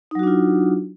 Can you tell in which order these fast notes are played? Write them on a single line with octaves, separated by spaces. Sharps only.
D#4 F#3 F#4 D4 F4